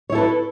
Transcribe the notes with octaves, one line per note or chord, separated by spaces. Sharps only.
E4 A4 B4 C#5